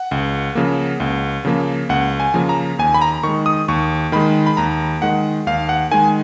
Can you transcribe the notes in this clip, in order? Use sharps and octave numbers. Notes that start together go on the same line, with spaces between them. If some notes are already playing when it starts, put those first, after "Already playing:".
Already playing: F#5
C#2
C#3 F3 A#3
C#2
C#3 F3 A#3
C#2 F#5
G#5
C#3 F3 A#3
A#5
D#2 G#5
B5
A#5
D#3 G#3 C#6
D#6
D#2 C#6
D#3 G#3 B5
B5
D#2 A#5
D#3 G#3 F#5
D#2 F5
F#5
D#3 G#3 G#5